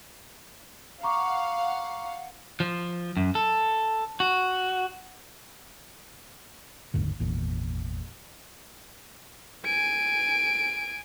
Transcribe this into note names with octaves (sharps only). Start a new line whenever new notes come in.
F5 F#5 A#5 C#6 D6
F3
F#2
A4
F#4
F#1 D#2 G#2 D3
G#1 E2 A#2
G#5 D7